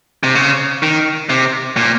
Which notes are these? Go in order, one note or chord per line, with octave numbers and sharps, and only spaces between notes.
C3
C#3
D#3
C3
A#2